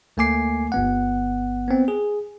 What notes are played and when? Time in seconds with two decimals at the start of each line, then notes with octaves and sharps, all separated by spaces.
0.17 D2 A3 A#3 G#5 D6 C7
0.72 G1 B3 F#5
1.68 B3 C4
1.88 G#4